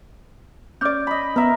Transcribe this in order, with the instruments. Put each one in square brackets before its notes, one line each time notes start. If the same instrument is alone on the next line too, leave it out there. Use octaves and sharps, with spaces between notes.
[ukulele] C#4 D5 [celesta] D6 G6
[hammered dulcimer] D#5 B5
[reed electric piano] B3 [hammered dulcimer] A#4 E5